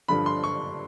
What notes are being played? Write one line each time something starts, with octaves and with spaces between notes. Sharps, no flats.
G2 D3 F3 B5
C6
C#6